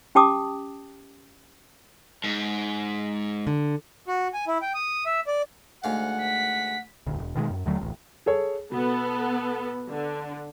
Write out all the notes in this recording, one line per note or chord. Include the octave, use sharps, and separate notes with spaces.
C#4 G4 G5 A5 D6 D#6
G#2
D3
F#4
G#5
E4
G5
D#6
E5
D5
D2 G#2 F5 F#5
B6
D#1 D2
E1
B2 D#3 E3 G#3
F#2
D#2 D3 F#3 A3
D1 A1
G#4 A4 C#5
B2 B3 A4
D3